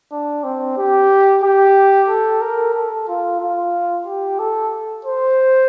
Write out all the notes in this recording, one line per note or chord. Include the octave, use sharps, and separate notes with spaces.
D4
C4
G4
G4
A4
A#4
A4
F4
F4
G4
A4
C5